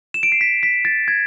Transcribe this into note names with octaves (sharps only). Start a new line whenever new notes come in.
E7
D7
C7
B6
B6
A6
G#6